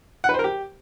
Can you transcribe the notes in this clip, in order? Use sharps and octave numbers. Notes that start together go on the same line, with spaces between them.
F#5
B4
C5
A#4
G4